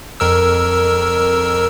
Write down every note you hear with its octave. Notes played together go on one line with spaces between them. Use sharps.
F2 A#4 E6